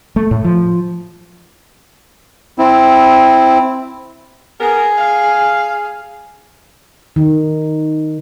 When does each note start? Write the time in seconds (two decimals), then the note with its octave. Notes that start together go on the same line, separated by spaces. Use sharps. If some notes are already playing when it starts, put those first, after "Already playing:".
0.16 A3
0.31 A2
0.44 F3
2.58 C4 E4
4.61 B3 G#4 A#4
4.98 F5
7.16 D#3